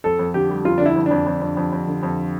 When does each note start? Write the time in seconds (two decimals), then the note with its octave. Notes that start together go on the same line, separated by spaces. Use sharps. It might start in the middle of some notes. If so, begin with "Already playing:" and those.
0.04 F2 A4
0.19 F2
0.34 D3 G4
0.50 G3
0.65 F2 F4
0.78 D4
0.81 D3
0.86 E4
0.96 F2
1.06 F2 D4
1.27 F2
1.41 F2
1.57 F2
1.72 F2
1.87 D3
2.03 F2